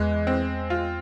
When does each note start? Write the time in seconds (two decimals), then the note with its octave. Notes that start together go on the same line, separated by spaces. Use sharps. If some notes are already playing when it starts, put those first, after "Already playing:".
Already playing: E2 E3 G#3
0.27 C4
0.70 F4